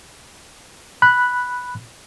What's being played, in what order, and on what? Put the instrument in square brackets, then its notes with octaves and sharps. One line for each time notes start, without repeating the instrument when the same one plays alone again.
[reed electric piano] B5 F#6